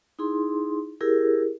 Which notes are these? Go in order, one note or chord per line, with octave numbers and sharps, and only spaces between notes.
D#4 E4 G#4 C6
E4 G4 G#4 A#4